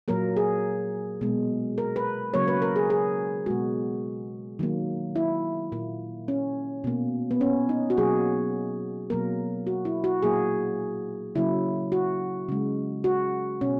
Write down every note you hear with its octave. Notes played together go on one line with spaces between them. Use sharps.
A#2 F#3 A#3 A#4
G#4
B2 G#3
A#4
B4
C#3 F#3 A#3 C#5
B4
A#4
G#4
G#4
B2 G#3 F#4
D#3 F#3 A#3
E4
A#2 A#3
C#4
B2 A#3
B3
C#4
D#4
F#4
B2 F#3 A#3 G#4
B2 F#3 A#3 A#4
F#4
E4
F#4
A#2 F#3 A#3 G#4
C#3 F#3 A#3 E4
F#4
C#3 G#3
F#4
B2 C#4